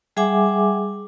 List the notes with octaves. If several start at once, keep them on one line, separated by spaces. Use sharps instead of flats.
G3 G#4 E5 F#5 G#5 D6